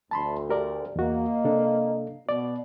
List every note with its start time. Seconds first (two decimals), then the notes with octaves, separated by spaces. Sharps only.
0.11 D2 A5 B5 C6
0.50 G4 A#4 D5
0.96 E2 A#3 F#4 D#5
1.44 C3 D4 A4
2.29 B2 D5